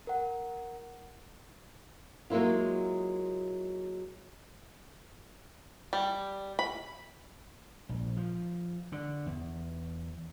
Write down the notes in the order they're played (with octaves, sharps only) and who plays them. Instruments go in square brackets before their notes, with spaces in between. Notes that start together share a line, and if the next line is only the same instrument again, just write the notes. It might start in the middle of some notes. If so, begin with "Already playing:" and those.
[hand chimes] A#4 F#5
[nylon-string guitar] F#3 G#3 A#3 E4 F4
[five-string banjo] G3
B5
[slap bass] A#1
F3
D3
E2